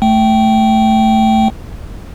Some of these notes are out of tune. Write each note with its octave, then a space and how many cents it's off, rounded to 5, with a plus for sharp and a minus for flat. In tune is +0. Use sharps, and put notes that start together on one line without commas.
A3 +0 G5 -15